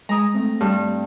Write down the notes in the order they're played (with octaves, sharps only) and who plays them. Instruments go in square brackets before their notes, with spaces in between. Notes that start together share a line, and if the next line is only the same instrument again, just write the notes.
[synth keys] G#3 D#6 [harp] A#5
[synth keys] A3 C4
[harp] G2